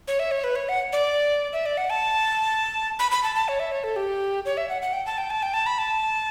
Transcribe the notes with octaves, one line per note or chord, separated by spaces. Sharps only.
C#5
E5
C#5
B4
C#5
F#5
D5
E5
D5
F#5
A5
B5
B5
A5
A5
C#5
E5
C#5
A4
G4
C#5
E5
F#5
F#5
G5
A5
G5
A5
G5
A5
B5
A5